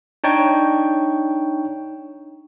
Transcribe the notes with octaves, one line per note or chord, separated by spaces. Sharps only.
D4 D#4 C#5 G5 C#6